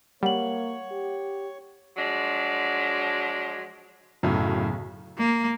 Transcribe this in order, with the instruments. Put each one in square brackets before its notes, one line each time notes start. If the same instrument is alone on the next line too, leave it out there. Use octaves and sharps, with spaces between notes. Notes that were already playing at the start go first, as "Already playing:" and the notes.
[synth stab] G3 [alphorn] A#3 [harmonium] C#5 [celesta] F#5 F#7
[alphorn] G4
[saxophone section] F3 F#3 G#3 D4
[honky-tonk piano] B1 [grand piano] F#2 A2 [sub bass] C#3
[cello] A#3